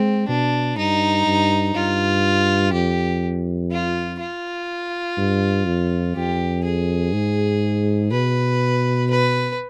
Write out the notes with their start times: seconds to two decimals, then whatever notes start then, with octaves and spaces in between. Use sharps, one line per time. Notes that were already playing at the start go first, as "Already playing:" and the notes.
Already playing: G#3 C4
0.28 B2 D4
0.77 G2 D#4
1.26 G2
1.74 G2 F4
2.73 F2 G4
3.71 F4
4.20 F4
5.17 G2
5.67 F2
6.15 F2 G4
6.64 G#4
7.14 G#2
8.11 B2 B4
9.10 B4